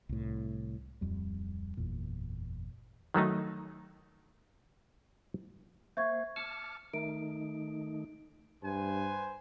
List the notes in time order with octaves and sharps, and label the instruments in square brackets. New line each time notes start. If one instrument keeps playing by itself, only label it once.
[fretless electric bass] C2 A2
D1 F2 G3
F#1 E2 A#2
[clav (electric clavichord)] D#3 F#3 A3 D#4
[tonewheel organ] A#3 C5 [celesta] E5 C#6 G#6
[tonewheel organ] A5 D6 F6 [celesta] C#7
[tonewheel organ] D#3 A3 D#4 [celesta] D7
[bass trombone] G2 [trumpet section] B4 C5 G#5